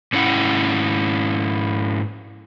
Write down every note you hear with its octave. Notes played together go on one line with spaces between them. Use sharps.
G#2 C#4 E4 F#5